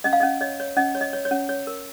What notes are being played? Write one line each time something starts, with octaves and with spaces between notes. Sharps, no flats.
C#4 D#5
F5
D#5
C#4
C#5 D#5
C#5
C#4 D#5
C#5
D#5
C#5
C#5
C#4
C#5
A#4